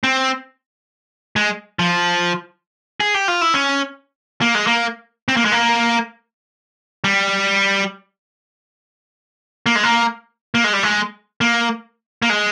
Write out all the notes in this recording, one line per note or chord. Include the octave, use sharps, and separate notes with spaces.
C4
G#3
F3
G#4
G4
F4
E4
C#4
A#3
G#3
A#3
C4
A#3
G#3
A#3
G3
A#3
G#3
A#3
A#3
G#3
G3
G#3
A#3
A#3
G#3